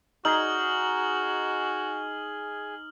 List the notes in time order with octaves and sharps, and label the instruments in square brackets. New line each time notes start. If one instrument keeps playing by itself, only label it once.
[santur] D#4 [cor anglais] F#4 [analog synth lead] G#4 [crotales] F6 F#7